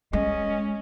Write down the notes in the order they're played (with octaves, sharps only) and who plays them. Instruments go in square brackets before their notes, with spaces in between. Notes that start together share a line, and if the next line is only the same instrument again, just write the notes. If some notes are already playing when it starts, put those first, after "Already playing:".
[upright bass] G#3 [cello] C#4 [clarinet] D#5